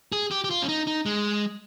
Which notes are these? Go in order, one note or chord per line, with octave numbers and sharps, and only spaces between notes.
G#4
G4
G4
F4
C#4
D#4
D#4
G#3